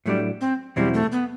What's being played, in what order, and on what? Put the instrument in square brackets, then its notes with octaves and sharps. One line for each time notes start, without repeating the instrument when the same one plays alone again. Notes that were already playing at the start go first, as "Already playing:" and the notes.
[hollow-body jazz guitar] A2 F#3 A3 D4 [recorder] G3
[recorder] C4
[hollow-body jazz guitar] E2 B2 F#3 C4 E4 [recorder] G3
[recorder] A3
B3